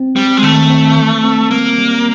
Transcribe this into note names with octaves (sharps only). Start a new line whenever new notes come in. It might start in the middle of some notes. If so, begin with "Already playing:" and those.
Already playing: C4
G3 C4
G#3
D#3 A3
C4
E3
C4
G3 A#3
G3